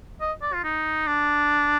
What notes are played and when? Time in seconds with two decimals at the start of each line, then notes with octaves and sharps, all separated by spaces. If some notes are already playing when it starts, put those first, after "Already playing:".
0.21 D#5
0.42 D5
0.53 F4
0.64 D#4
1.07 D4